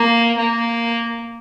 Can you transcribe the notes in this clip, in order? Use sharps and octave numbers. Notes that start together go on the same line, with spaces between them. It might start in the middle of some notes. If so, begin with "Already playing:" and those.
Already playing: A#3
A#3